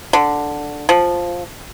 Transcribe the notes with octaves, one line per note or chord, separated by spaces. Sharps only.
D3
F3